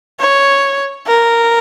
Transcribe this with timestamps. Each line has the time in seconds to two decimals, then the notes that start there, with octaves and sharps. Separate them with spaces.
0.20 C#5
1.06 A#4